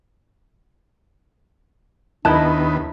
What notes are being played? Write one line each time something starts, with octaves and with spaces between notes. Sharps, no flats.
D#2 B3 D4 E4 A#4 D#5 A5 F#6